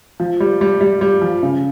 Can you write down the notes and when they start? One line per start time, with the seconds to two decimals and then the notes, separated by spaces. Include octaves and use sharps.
0.20 F3
0.40 G3
0.61 G3
0.81 G3
1.01 G3
1.22 F3
1.43 C#3